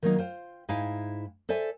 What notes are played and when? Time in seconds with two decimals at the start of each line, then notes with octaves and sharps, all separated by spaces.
0.02 D#3 F#3 A#3 D4 D#4
0.18 F4 C5 G5
0.69 G#2 D#4 E4 F5 G5 G#5
1.49 A4 C5 D5 E5 G#5